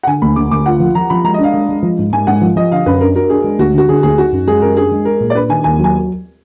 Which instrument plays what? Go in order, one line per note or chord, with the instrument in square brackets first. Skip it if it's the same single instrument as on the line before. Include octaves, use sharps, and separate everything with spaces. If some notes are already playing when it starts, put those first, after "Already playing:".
[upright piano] F#5
[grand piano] D3 [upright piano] G#5
[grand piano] D2 [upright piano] B5
[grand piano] D2 [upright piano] D6
[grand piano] D2 [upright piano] D6
[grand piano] F4 [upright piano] F#5
[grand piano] F3
[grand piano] F3 [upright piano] A#5
[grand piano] F3 [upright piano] B5
[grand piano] G#3 [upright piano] A#5
[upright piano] D#5
[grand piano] D4
[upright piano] F5
[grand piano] G#3
G#3
F3
G#2
[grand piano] G#2 [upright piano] G#5
[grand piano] G#2 [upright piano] F#5
[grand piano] F3
[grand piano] F3 [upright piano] D#5
[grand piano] D3 [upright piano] F5
[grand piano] F#2 [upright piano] B4
[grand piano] D4 [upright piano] A#4
[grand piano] F#4 [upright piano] A#4
[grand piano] D4 [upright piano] G#4
[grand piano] G#3
[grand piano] D2 [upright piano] F#4
[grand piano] D3 [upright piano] F#4
[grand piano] D3 [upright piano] G#4
[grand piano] D2 [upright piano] G#4
[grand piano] D#4 [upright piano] F#4
[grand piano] F#2
[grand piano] G#3 [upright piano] G#4
[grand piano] F#2 [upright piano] A#4
[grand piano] D4 [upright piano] G#4
[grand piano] G#3
[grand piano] G#4 [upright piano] A#4
[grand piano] A#2
[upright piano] D5
[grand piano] D4 [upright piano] B4
[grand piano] D#3 [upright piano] G#5
[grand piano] D#2 [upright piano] G#5
[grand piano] F#3 [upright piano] G#5